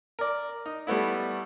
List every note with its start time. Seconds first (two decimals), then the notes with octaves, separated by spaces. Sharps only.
0.19 A#4 D5
0.66 D#4
0.87 G3 A3 B3 E4